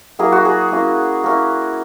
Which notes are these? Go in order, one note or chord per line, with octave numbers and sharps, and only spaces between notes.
F#3 A#3 E4 G#4
F#4
G#4
A#3 C#4 E4
A#3 C#4 E4